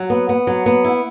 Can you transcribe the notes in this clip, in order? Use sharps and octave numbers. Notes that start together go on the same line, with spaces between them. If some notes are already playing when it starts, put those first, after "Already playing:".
Already playing: F#3
B3
B3
F#3
B3
E4